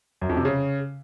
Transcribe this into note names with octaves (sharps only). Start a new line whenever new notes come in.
F#2
F2
C3
C#3